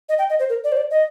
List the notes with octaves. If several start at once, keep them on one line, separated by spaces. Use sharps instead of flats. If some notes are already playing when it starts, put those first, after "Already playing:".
D#5
G5
D#5
C5
A#4
D5
C5
D5
D#5